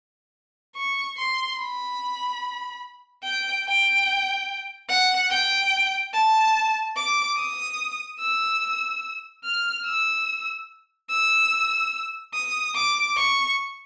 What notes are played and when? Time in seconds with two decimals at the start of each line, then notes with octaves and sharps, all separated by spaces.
0.76 C#6
1.17 C6
1.58 B5
3.24 G5
3.65 G5
4.89 F#5
5.30 G5
6.13 A5
6.96 D6
7.37 D#6
8.20 E6
9.44 F6
9.85 E6
11.10 E6
12.33 D#6
12.75 D6
13.17 C#6